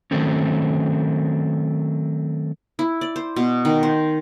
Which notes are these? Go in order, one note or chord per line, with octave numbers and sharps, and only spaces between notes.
D#3 F#3 A3 C4 C#4
E4
D5
C5
B2
D#3
C5